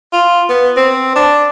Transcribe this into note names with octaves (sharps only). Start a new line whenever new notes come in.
F4
B3
C4
D4